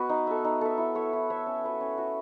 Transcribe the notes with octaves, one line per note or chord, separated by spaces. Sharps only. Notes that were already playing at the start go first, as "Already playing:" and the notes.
Already playing: B3 F#4 B4 D#5
D#4
A4 E5
D#4
A4 E5
E4
A4 C#5 E5
E4
A4 C#5 E5
C#4
F#4 B4 E5
C#4
F#4 B4 E5